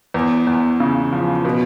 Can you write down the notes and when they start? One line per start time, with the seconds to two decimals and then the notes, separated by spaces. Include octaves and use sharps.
0.14 E2
0.47 E2
0.80 C#3
1.12 F3
1.45 B2